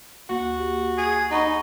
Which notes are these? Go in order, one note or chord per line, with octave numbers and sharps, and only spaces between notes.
D2 A#3 F#4
G4
G#4
D#4 F#5 B5 C#6